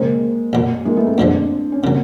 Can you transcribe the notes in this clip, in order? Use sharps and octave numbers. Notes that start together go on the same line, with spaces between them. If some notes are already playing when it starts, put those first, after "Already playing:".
Already playing: C#3 F3 G#3 A#3 C4
B1 A#2 F#3
G#3 A#3
A3 B3
A#3 C4
F2 D3 F3 G#3 C4 D4
C#4
C#3 F#3 A#3 C4